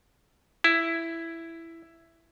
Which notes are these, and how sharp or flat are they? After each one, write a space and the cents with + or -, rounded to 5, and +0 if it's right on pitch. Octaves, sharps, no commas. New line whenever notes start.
E4 +5